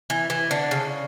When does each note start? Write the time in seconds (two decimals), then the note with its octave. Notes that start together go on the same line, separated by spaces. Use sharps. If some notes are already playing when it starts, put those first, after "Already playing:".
0.10 E3
0.30 E3
0.51 D3
0.71 C#3